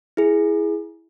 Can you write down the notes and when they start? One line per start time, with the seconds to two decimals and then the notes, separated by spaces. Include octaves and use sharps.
0.17 E4 G#4